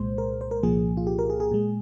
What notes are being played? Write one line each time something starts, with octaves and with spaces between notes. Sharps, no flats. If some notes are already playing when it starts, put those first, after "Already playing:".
Already playing: C2 A#2 G#3 C5
A#4
C5
A#4
C2 A#2 F3 A#3 G#4
F4
G4
A#4
G#4
G#4
A#2 G#3